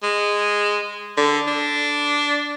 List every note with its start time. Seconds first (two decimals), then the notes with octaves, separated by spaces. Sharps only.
0.03 G#3
1.17 D3
1.48 D4